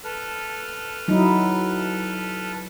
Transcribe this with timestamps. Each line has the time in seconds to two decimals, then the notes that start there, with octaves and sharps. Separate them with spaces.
0.04 A4 B4 F6
1.08 F#3 D#4 E4